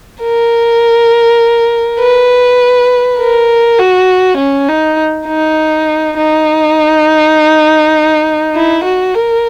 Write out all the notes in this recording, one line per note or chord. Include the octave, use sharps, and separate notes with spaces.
A#4
B4
A#4
F#4
C#4
D#4
D#4
D#4
E4
F#4
A#4